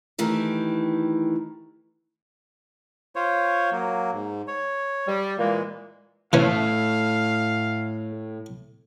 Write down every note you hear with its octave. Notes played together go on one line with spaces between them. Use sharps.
D#3 E3 A3 G4
F4 C5 C#5
F#3 A#3
G#2
C#5
G3
A#2 E3 G#3 A#3
A2 E3 A3 C#4 F5